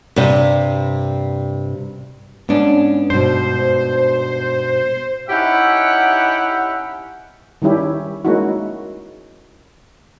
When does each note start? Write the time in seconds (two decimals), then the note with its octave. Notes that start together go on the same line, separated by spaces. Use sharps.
0.16 G2 C3
2.49 G#2 B3 C#4 D4
3.10 G2 B2 C5
5.29 C#4 D#4 E4 G4 E5 F#5
7.62 D#3 G3 C#4 E4 G4
8.25 G#3 A#3 C#4 D#4 E4 F#4